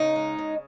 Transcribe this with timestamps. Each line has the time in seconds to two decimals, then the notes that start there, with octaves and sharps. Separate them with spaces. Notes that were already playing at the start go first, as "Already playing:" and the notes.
Already playing: C#3 D#4
0.16 G#3
0.38 C#3